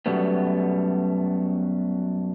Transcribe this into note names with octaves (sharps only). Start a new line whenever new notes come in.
F#2 B2 G3 A3 B3